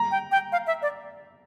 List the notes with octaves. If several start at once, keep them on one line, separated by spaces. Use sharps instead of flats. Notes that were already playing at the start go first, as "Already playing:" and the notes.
Already playing: A#5
G5
G5
F5
E5
D5